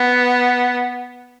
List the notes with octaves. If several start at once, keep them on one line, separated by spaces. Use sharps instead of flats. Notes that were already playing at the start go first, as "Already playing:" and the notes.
Already playing: B3